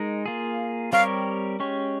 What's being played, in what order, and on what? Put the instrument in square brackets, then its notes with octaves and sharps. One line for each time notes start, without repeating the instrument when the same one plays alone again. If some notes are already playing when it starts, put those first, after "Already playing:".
Already playing: [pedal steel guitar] G#3 D#4 A#4
A#3 F4 G#4
[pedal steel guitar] G3 C4 G4 A#4 C#5 [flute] F5
[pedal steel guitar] G#3 C#4 G4 C#5